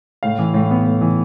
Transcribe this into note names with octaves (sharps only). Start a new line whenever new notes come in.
A2 F5
E3
A2
B3
A2
E3